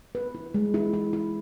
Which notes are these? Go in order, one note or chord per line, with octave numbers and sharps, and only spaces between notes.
B4
E4
G#3
E4
E4
E4